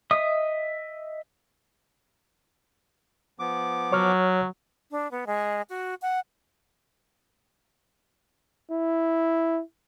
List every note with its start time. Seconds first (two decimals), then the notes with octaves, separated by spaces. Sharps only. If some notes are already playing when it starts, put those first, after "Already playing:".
0.11 D#5 E5 D#6
3.39 F3 B3 D6
3.92 F#3 C#5 C#6 F6
4.91 D4
5.11 B3
5.27 G#3
5.69 F#4
6.02 F#5
8.71 E4